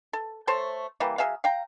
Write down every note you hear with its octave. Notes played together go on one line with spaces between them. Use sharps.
A4
A3 A4 C5 C#5
E3 G3 A#3
F#3 G#4 E5 F5
F5 G5 A#5